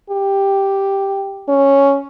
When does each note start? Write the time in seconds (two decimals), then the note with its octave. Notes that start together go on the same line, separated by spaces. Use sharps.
0.10 G4
1.48 C#4